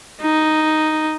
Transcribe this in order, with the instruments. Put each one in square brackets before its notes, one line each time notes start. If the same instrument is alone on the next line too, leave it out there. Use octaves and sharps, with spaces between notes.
[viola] D#4